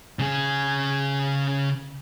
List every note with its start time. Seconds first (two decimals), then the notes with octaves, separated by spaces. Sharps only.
0.19 C#3 G#4